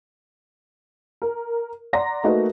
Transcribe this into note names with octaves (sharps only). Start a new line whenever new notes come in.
A#4
D5 F#5 A#5 C6 A#6
A3 A#3 D#4 F#4 B4